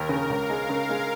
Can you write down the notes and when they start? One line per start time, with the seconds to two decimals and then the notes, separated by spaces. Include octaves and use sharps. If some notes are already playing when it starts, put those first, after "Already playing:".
Already playing: D#2 A#4
0.09 C#3
0.29 C#2 F5
0.50 G#3
0.69 C#3
0.89 G#3